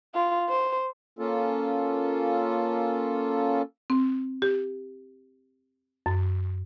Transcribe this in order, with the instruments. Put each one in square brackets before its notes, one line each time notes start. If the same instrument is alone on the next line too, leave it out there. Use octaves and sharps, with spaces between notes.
[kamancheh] F4
C5
[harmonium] A#3 C#4 F4 A4
[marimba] C4
G4
F#2